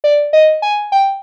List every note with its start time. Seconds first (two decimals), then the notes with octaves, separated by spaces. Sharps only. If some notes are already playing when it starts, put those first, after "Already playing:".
0.04 D5
0.33 D#5
0.62 G#5
0.92 G5